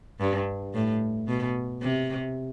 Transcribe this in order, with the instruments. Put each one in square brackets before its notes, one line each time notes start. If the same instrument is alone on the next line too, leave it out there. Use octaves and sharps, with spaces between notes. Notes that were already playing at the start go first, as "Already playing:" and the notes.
[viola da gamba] G2
A2
B2
C3